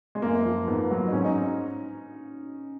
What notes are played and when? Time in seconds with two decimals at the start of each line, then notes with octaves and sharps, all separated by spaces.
0.15 G#3
0.22 F#2 A#3
0.45 F3
0.68 G#2 B3
0.91 F#3
1.08 D#4
1.13 G#2 C#4
1.24 D#4